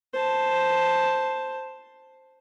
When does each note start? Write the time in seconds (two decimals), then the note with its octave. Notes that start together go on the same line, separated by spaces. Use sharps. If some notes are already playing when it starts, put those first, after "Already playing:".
0.13 C5 A5